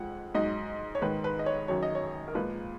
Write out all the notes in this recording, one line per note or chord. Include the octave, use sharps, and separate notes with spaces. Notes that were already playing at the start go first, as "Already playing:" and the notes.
Already playing: F2 F3 G#3 F#5
G#2 F#3 D#5
C#5
G#2 D#3 G#3 B4
B4
D#5
C#5
F#2 D#3 F#3 C#5
D#5
C#5
A#4
A#2 F3 G#3 B4